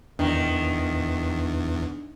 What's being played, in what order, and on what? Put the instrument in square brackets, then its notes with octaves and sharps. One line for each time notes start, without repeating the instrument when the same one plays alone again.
[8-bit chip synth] E2 [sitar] D#3 [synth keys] D4